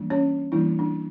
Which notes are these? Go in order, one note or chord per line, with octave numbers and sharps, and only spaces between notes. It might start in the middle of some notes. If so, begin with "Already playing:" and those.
Already playing: E3 G3 A#3 D4
C#4 C#5
E3 G3 A#3 D4 E4
D4